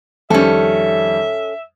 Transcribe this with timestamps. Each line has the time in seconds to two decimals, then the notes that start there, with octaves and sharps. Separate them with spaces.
0.30 F2 D#3 G3 C#4 A4 E5